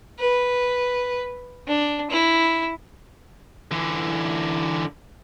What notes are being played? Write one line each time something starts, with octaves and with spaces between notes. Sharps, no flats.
B4
D4
E4
D3 E3